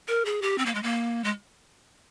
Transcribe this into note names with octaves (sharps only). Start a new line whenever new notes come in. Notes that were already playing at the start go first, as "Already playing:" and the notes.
A#4
G#4
G4
C4
A#3
G#3
A#3
G#3